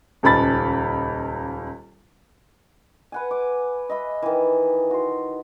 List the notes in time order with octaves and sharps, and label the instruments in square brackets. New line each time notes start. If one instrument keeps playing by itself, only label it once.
[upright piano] D#1 C#2 B5 A6
[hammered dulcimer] B4 F#5 G#5
D6
D#5 E5 B5
D#3 E3
F#4 C6